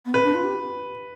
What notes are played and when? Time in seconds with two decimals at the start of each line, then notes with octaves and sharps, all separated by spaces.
0.06 B3
0.14 C4 B4
0.24 D4
0.35 F4
0.44 G4